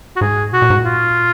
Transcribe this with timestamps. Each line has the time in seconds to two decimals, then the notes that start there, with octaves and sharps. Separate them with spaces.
0.16 F#4
0.21 G#2 G#4
0.52 B2 F#4
0.62 A#2
0.70 G#2
0.79 A#2
0.85 F4